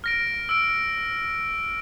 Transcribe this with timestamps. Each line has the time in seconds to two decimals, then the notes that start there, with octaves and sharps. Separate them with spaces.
0.04 F6 A#6 D7
0.49 E6 D7